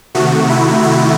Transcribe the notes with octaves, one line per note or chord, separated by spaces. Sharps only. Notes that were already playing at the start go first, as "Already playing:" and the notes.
C3 D#3 A3 F#4
E4
E4